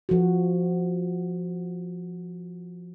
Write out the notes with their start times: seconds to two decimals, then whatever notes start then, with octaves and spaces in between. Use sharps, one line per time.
0.09 F3 F#4